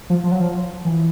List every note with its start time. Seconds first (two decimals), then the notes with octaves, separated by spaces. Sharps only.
0.10 F3
0.24 F3
0.32 F#3
0.40 F3
0.85 E3